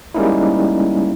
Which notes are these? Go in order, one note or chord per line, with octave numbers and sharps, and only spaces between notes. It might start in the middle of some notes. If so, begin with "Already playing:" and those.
G3 G#3 A#3 C#4 D#4 E4